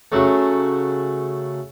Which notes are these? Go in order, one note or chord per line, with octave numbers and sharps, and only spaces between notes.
C#3 F#3 A3